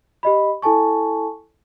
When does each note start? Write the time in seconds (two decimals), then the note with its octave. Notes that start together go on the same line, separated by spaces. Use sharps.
0.23 G4 D#5 B5
0.62 E4 A4 G#5 A5 C#6